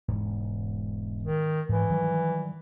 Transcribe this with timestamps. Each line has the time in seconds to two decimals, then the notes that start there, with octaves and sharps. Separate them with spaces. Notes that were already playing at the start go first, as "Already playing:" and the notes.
0.08 E1 G#2
1.23 D#3
1.69 G#2 E3
1.89 D#3 F#3 G3